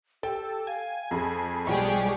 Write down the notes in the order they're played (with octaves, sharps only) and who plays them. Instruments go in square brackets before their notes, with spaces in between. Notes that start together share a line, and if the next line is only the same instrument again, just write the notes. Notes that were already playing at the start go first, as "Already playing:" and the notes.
[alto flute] G4 [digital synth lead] A4 [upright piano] G5
[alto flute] F5 [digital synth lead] G#5
[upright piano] F2 G#4 [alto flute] B5
[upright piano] B1 F3 [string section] G3 G4 G#4 [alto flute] D5 [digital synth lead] C#6